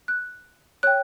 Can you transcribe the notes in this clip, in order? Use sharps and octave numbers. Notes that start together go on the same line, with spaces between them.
F#6
C#5 G5 F#6